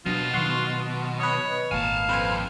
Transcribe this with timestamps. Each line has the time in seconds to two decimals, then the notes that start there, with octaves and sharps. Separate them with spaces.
0.06 B2 F#3 D4 F4
0.34 D#3 F#3 F#5 C6 C#6
1.20 B4 C#5 D#5
1.71 G#1 A#2 F5 G#5 A5
2.09 F2 B4 C5 G#5